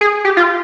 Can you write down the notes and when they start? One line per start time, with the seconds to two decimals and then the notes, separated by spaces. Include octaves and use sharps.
0.01 G#4
0.25 G4
0.37 F4